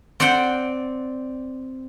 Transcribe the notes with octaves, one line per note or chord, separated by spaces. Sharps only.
C4 D5 F#5 G5 C6